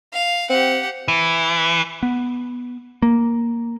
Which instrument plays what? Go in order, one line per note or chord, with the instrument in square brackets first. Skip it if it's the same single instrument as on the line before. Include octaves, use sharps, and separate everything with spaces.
[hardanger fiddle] F5
[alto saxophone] C4 [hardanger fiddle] G4 F#5
[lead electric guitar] E3
[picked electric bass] B3
A#3